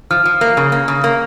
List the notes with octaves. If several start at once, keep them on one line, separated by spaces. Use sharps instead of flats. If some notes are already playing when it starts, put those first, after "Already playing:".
F3 F6
F3
A#3
C#3
A#3
C#3
A#3